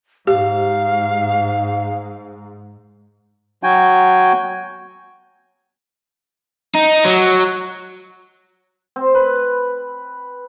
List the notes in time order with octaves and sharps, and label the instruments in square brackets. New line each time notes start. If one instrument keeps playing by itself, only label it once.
[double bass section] G#2 [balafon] G4 [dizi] F5
[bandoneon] F#3 F#4 G5 G#5
[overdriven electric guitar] D#4
F#3
[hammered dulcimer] C4
B4